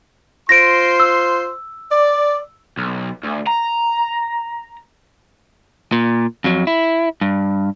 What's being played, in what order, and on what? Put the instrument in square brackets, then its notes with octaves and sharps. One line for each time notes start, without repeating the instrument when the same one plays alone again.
[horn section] F4 C5 C6 [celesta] A#6 D7
[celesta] E6
[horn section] D5
[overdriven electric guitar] B1
D2
A#5
[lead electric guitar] A#2
F2 F#3
E4
G2